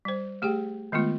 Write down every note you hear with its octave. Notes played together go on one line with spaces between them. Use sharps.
G3 C5
A3 G4 G#4 G5
D#3 G#3 A3 B3 F4